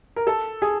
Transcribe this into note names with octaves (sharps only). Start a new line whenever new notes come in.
A#4
A4
G#4